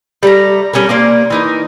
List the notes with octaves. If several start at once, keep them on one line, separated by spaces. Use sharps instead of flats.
G3 A3 E5 A#5
G3 C#4 A4 A#4
A#3 C5 D5
E3 D#4 A#4